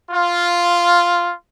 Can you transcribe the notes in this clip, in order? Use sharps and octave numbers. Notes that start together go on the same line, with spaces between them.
F4